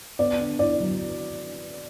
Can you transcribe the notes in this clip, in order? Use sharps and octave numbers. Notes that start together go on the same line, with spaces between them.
B3 D5
D3
E4 D5
F#3